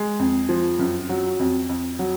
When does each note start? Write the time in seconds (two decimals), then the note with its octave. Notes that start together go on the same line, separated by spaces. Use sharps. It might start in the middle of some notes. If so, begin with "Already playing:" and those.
Already playing: G#3
0.19 F2
0.49 F3
0.79 F#2
1.09 F#3
1.39 F2
1.69 F2
1.99 F#3